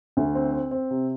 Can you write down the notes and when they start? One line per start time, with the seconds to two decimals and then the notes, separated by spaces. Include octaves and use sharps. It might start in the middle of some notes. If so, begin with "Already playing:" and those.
0.17 D2
0.35 C4
0.53 C4
0.71 C4
0.91 C3